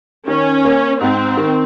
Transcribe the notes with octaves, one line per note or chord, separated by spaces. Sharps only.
D#3 C#4
A#3
G#2 C4
D#3